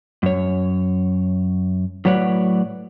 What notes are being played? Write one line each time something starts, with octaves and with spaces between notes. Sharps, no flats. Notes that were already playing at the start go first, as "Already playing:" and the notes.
F#2 C#5
A2 F#3 B4 C#5 D5 F#5